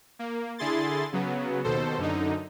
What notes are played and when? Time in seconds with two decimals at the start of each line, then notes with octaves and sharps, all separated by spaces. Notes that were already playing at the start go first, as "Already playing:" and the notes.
0.19 A#3
0.58 D3 E4 G#4 C6 A6
1.13 C#3 F#3 B3
1.64 D#2 B2 A4 C5
1.98 F#2 D3 D#4